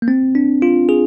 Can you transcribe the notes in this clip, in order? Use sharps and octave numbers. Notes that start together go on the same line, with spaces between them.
A#3
C4
D4
F4
G#4